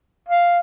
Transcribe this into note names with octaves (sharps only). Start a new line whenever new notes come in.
F5